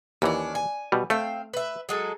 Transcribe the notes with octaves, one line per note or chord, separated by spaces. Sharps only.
D#2 E3 C#4 D4
G#5
B2 G3
A3 C4 F5
B4 E5
F#3 G#3 A4